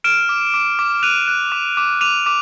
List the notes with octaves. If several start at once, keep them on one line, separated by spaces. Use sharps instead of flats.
F6 D7 E7
D6
D6
D6
F#6 D#7 F7
F#6
D6
D6
D6 D#7 F7
D6